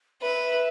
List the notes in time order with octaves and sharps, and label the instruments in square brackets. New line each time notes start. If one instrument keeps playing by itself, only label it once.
[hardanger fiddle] B4 [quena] E5